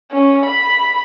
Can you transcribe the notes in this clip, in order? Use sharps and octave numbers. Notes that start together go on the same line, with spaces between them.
C#4
B5